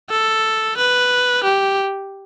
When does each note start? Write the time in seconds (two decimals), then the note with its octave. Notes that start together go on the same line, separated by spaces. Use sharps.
0.10 A4
0.77 B4
1.44 G4